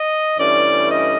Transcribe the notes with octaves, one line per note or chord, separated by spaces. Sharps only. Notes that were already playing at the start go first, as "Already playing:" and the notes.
Already playing: D#5
G2 E3 A3 C#4 D5
D#5